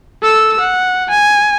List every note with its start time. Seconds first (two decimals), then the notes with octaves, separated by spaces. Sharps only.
0.22 A4 E6
0.61 F#5
1.10 G#5